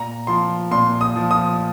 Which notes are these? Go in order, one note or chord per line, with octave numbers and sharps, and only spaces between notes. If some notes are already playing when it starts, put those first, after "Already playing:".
Already playing: A#2 A#5
F3 C6
A#2 C6
D#6
F3
D#6